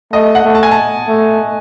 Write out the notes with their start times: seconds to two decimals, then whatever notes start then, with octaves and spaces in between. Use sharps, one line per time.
0.13 A3 D#5
0.35 F#5
0.45 A3
0.55 A5
0.63 G#5
0.71 A5
1.08 A3